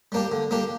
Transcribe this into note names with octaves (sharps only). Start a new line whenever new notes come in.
G3 A#3 D4 G4
D3
G3 A#3 D4 G4